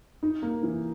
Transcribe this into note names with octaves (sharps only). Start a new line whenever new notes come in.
D#4
A#3
E3